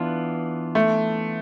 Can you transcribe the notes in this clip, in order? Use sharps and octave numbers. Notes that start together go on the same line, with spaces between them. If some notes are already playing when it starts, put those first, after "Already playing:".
Already playing: E3 B3 D4 F4
A3